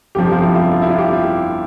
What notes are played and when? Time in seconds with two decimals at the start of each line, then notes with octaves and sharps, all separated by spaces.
0.15 G1 F2 C3 F3 G4
0.31 F4
0.43 E4
0.55 F4
0.82 E4
0.89 F4
0.98 G4